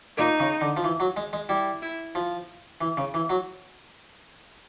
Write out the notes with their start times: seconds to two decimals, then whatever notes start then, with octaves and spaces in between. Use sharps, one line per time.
0.17 A#2 D#4
0.40 C#3
0.61 D3
0.77 F3
0.84 E3
1.00 F#3
1.17 G#3
1.33 G#3
1.49 G3 E4
1.82 E4
2.15 F3
2.81 E3
2.97 C#3
3.14 E3
3.30 F#3